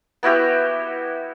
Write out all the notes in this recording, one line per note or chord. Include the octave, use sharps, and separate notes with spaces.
B3 E4 F#4 G4